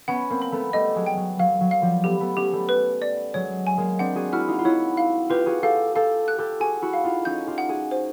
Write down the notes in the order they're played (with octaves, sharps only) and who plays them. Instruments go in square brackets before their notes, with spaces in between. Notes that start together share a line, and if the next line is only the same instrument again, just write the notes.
[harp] B3 C#4 [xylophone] F#5
[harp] A#3 C4
[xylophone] B5
[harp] A3 B3
[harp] G3 A3 [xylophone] D#5
[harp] F#3 G#3
[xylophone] G5
[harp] F#3
[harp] F#3 [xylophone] F5
[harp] F#3
[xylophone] F5
[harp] F3 G3
[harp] A3 B3 [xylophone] G4
[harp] A3 B3
[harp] B3 C#4 [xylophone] G4
[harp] G3 A3
[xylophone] B4
D5
[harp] F#3 G#3 [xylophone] C#5
[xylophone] G#5
[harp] G#3 A#3
[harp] C4 D4 [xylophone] F#5
[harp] F#4 G#4
[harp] E4 F#4 [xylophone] F6
[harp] D#4 F4
F4
[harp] E4 F#4 [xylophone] C#5
[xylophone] F5
[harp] F4 G4 [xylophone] B4
[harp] F#4 G#4
[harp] G4 A4 [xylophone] F5
[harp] G4 A4 [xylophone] F5
[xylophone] F#6
[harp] G4 A4
[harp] F#4 G#4 [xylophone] G#5
[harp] E4 F#4
[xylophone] F5
[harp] D#4 F4
[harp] C#4 D#4 [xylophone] G6
[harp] F4 G4
[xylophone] F#5
[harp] F#4 G#4
[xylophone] C5